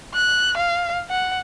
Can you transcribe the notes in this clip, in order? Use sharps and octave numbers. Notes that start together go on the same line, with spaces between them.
F#6
F5
F#5